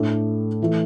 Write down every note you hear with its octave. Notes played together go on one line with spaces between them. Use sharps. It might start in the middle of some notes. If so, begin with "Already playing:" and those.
Already playing: A2 A3 D4 A4
E3 A3